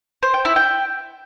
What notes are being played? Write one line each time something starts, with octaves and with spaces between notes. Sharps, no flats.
C5
G5
E4
G5